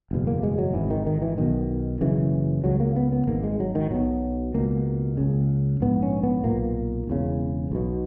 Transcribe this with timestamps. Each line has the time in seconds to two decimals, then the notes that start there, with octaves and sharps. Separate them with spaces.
0.11 F#1 E2 B2
0.27 A#3
0.43 G#3
0.58 F#3
0.74 G#1 G#2 E3
0.90 D#3
1.07 D#3
1.22 E3
1.38 B1 B2 D#3
2.01 F#1 F#2 C#3 E3
2.64 C#2 C#3 F#3
2.80 A#3
2.96 B3
3.12 B3
3.27 G#1 G#2 A#3
3.43 G#3
3.60 F#3
3.75 D#3
3.91 B1 B2 F#3
4.54 C#2 B2 A#3
5.17 C#2 C#3
5.81 A#1 G#2 B3
6.03 C#4
6.23 B3
6.44 B1 A#2 A#3
7.08 E1 E2 C#3
7.72 B1 B2